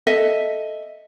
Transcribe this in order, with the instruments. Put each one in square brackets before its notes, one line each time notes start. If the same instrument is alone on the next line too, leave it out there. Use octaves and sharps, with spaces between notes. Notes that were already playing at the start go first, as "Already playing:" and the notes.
[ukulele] A4 D#5 E5